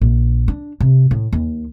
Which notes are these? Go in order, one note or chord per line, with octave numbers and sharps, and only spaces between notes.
A#1
D4
C3
A2
D#2